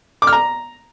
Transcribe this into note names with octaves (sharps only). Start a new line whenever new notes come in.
D6
F6
A#5